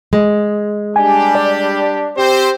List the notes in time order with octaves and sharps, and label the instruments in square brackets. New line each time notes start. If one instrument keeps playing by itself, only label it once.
[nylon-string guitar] G#3
[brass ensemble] G3 D4 G4 [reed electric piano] G#5
[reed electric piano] D5
[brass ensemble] C4 G4 C5